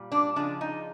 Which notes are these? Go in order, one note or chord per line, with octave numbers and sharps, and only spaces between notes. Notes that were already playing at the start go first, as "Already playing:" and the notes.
Already playing: A#2 G3
D4
C#3 F3 G#3 D4
D#4